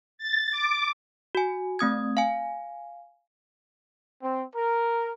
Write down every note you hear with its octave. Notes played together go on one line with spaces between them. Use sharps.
A6
D6
F#4 G#5
A3 C4 D#6 G#6
F5 G#5
C4
A#4